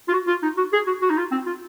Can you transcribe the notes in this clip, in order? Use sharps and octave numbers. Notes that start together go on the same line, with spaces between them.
F4
F#4
F4
D#4
F#4
G#4
F#4
F#4
D#4
F4
C4
F4